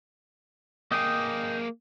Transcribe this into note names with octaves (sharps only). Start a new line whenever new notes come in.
A#3 G#4 D#5 G5